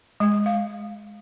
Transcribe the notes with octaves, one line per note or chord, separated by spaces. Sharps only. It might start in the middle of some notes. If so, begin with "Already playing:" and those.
G#3
F5